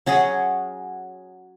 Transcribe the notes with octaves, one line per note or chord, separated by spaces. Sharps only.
F#3 C#4 F#4 G#4